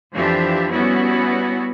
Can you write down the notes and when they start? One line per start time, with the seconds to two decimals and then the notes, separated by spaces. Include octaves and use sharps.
0.13 F2 E3 F3 D4 G4 E5
0.70 G3 B3 C#4 E4 F#4